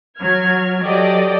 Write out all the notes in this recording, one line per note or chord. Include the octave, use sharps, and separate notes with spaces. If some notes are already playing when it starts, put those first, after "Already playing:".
F#3 F6 G#6
F#3 G4 A4 D5 D#5